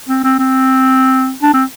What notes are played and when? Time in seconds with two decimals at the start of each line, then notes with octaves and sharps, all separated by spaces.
0.09 C4
0.24 C4
0.39 C4
1.42 D4
1.54 C4